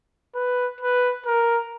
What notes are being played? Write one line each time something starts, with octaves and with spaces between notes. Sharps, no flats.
B4
B4
A#4